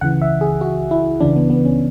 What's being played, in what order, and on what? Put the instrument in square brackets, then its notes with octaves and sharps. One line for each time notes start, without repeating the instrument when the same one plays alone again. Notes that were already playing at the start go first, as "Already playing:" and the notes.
[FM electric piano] C#2 C#3 E3 F#5
E5
G#4
F#4
E4
C#2 C#3 E3 D4
B3
B3
C#4